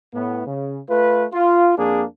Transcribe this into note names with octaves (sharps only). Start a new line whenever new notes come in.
A2 B3
C#3
A3 F4 B4
F4
F2 A#3 D4 G#4